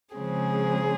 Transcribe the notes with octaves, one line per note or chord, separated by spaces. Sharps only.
C#3 F3 G#3 C4 G#4